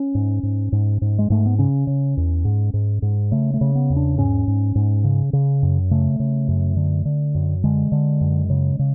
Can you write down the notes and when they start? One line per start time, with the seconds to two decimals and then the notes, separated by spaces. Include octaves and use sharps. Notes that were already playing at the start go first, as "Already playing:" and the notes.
Already playing: C#4
0.15 G#2
0.43 G#2
0.72 G#2
1.02 G#2
1.19 G#3
1.30 G#2 A3
1.46 B3
1.59 C#3 C#4
1.87 C#3
2.17 E2
2.45 G#2
2.74 G#2
3.02 G#2
3.31 C#3 A3
3.54 A3
3.61 C#3
3.75 B3
3.90 E2
3.96 D4
4.17 G#2 C#4
4.47 G#2
4.75 G#2
5.04 C#3
5.33 C#3
5.63 F#2
5.91 C#3 A3
6.20 C#3
6.48 F#2
6.77 D3
7.05 D3
7.35 F#2
7.64 D3 G#3
7.92 D3
8.21 F#2
8.50 C#3
8.79 C#3